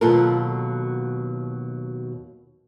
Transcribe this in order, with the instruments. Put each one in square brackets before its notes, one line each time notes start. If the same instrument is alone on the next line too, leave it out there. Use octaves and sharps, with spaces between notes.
[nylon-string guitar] D#2 B2 F#3 F4 A4 A#4